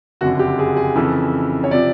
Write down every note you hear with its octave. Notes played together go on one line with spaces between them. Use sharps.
F#1 F2 D3 F#4
G4
G#4
G#4
F2 C#3 E3 A4
C#5
C3 F3 D5